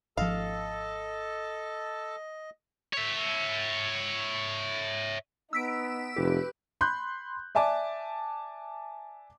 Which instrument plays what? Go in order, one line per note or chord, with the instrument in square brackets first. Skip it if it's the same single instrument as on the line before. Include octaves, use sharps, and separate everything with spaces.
[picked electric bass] G#1 F3 [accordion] A4 A5 [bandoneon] D#5 [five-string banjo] F5
[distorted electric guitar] C#5 E5
[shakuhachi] B3 [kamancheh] D#4 [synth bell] E6 B6 D7
[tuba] F1 [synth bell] G4 [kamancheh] B4
[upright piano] B5 C6 F#6 G6
D5 E5 G#5 A5 D6